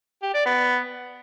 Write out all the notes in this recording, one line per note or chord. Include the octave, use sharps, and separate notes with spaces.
G4
D5
B3